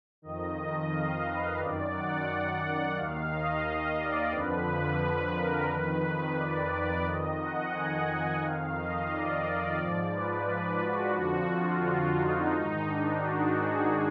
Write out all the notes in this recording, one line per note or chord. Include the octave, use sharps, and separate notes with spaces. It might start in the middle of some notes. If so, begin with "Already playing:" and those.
F2 D#3 D#5
D#5
F5
B4
F#2 D#3 D5
F#5
F#5
D#2 D#3 F5
D#5
D5
F2 D3 F3 B4
B4
A#4
F2 D#3 B4
D5
F2 D#3 D#5
F#5
G#5
F#5
F2 D#3 F5
D#5
D5
G#2 F3
B4
F#4
F2 D3 F3
F4
D#4
G#2 D#3
D4
F#4
G#4